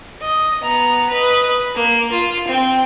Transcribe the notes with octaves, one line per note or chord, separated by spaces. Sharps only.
D#5
B3 A#5
B4 D#5
A#3
F4
C4 G5